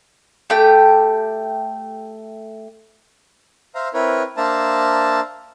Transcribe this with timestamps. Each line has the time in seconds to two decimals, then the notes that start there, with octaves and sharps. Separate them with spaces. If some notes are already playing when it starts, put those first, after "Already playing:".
0.50 A3 G4 G5
3.75 C5 E5 F5 A#5
3.94 C4 E4 A#4 B4 C#5
4.37 A#3 D4 C5 E5 A5 A#5